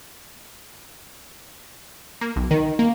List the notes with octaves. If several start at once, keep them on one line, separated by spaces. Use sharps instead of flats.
A#3
B1
D#3
A#3